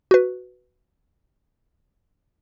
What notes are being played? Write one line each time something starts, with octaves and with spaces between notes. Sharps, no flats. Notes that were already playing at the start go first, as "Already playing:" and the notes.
F#4 B4